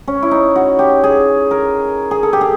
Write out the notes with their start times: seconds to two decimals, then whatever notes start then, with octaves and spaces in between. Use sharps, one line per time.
0.08 C#4
0.23 E4
0.31 D#4
0.55 F#4
0.79 G4
1.04 G#4
1.51 A#4
2.11 G#4
2.23 A4
2.33 G4
2.41 G#4